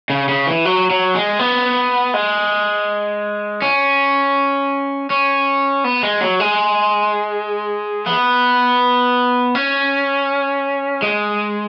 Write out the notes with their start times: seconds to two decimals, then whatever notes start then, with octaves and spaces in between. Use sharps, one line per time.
0.10 C#3
0.29 C#3
0.47 E3
0.65 F#3
0.90 F#3
1.15 G#3
1.39 B3
2.14 G#3
3.62 C#4
5.10 C#4
5.84 B3
6.03 G#3
6.21 F#3
6.40 G#3
8.06 B3
9.55 C#4
11.02 G#3